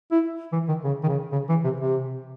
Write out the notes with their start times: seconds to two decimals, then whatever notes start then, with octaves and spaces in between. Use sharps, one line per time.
0.11 E4
0.53 E3
0.68 D#3
0.84 C#3
1.03 D#3
1.08 C#3
1.32 C#3
1.49 E3
1.64 C3
1.80 C3